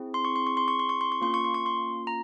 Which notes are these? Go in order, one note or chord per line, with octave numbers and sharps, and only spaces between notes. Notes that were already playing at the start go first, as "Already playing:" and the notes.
Already playing: C4 E4 G#4
C6
C#6
C6
C#6
C6
C#6
C6
C#6
C6
C#6
A#3 C#4 F4 C6
C#6
C6
C#6
C6
A#5